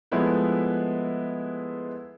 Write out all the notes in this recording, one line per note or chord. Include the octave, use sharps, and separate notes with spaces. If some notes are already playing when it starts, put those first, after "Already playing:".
F3 G#3 A3 B3 E4 B4